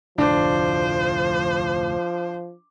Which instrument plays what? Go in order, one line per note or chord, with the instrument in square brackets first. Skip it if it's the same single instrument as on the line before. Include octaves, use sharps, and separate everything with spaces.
[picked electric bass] F1 D2 A2 [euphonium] F3 [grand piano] D4 [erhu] C5